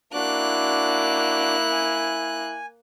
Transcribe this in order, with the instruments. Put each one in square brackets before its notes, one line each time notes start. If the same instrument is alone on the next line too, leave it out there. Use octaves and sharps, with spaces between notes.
[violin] A#3 F#6 [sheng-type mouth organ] D4 F#4 D6 [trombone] E4
[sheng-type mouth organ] G#5